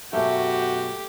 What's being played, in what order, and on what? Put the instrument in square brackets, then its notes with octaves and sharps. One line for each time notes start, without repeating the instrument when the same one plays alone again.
[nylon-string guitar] F#2 B2 [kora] A3 [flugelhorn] F#4 [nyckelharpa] G4